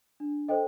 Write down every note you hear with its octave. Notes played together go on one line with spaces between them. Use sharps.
D4
A4 C5 D#5 G5